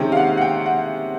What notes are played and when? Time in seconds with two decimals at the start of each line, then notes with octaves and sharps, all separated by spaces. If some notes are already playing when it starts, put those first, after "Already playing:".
Already playing: C3 D#3 G#3 C#4 G5
0.12 F5
0.17 F#5
0.37 F#5
0.41 G5
0.66 F#5